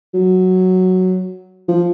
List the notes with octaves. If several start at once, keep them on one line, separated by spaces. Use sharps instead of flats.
F#3
F3